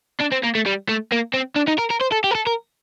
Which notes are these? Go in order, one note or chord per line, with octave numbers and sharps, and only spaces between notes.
D4
C4
A#3
A3
G3
A3
A#3
C4
D4
D#4
A#4
A#4
C5
A4
G4
A#4
A4
A#4